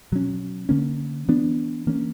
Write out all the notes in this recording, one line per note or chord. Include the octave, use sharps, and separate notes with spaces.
B2 F#3 C#4
D3 A#3 C#4
E3 B3 D4
E3 A#3 C#4